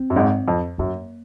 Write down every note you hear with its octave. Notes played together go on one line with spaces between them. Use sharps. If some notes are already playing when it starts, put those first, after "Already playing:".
Already playing: C4
F#2
G#1 G#2
F2
F#2 A#3